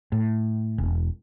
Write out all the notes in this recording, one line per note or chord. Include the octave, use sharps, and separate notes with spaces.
A2
E1